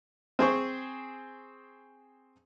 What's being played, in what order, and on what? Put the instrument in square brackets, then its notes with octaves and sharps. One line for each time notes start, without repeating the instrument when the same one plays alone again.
[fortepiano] C4 G#4 C5 C#6